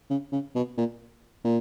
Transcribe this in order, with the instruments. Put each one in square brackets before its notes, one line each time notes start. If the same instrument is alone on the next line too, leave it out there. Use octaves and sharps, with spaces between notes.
[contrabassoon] C#3
C#3
B2
A#2
A#2